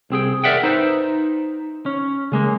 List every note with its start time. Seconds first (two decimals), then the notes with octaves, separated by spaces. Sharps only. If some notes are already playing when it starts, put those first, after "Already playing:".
0.10 C2 C4 G#4 G5
0.44 A#4 C#5 D5 E5 F#5 G5
0.63 D#4 B4 C5 E5
1.86 C#4
2.32 C#3 G#3 A#3